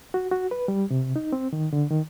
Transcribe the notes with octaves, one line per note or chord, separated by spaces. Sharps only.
F#4
F#4
B4
G3
C3
D#4
C4
D#3
D3
D#3